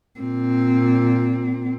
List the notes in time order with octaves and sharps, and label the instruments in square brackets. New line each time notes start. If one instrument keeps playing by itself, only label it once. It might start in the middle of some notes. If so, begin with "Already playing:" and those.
[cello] A#2 C4